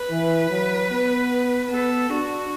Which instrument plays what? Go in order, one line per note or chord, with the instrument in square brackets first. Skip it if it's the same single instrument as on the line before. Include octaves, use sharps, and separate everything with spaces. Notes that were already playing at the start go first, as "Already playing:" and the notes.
Already playing: [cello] B4
[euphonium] E3
F#3
B3
[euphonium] B3 [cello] A4
[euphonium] D4 [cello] F#4